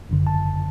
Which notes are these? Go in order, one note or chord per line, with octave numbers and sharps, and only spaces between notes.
G1 F#2 D3
A5